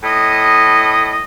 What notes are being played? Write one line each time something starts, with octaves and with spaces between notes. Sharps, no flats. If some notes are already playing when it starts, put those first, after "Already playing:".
A2 D#5